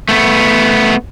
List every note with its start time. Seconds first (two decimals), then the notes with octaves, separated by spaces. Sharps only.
0.09 A3 B3